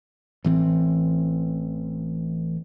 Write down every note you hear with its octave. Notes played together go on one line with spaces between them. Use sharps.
A1 E3 B3 C4